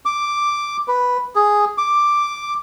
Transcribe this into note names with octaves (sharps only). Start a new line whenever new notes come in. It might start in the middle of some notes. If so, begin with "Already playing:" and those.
D6
B4
G#4
D6